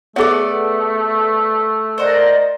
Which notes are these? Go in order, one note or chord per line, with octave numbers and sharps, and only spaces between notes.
A3 B3 G#4 A4 D5 E5
A#4 C5 D5 D#5 F#5